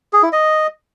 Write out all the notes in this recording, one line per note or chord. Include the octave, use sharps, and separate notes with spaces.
G#4
E4
D#5